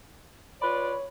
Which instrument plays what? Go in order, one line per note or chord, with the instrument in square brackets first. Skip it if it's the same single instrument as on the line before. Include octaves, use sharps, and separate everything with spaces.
[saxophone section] F4 B4 D5 [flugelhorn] C#5 [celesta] B5